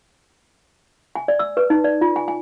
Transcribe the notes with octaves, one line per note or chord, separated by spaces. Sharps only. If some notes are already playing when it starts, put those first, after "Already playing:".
G#5
D5
E6
B4
D#4
D5
F4
G#5
G#5